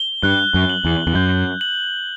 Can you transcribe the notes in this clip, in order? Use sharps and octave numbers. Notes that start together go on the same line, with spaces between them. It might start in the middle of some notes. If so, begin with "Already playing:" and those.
Already playing: G7
G2 F#6
F#2
F#7
E2
E2
F#2 G6
F#7